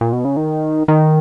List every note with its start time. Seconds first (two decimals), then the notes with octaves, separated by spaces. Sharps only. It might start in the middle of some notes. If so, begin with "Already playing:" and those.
0.01 A#2
0.13 B2
0.25 C#3
0.37 D#3
0.88 D#3